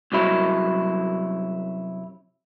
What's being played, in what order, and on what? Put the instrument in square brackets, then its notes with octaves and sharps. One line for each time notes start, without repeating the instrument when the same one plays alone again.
[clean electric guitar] C2 F#2 F#3 E4